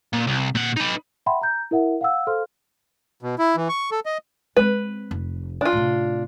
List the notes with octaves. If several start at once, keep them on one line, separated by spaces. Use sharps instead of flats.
A#2
C2
A#2 F#5
D#4 B4
E5 F#5 G5 B5 C6
A#5 G6
E4 A#4 E5 F#5
F5 F#5 E6
A4 C5 F5 C6 F6
B2
E4
E3
C#6
A4
D#5
G#3 C4 B4
F1
D4 F4
A2 C3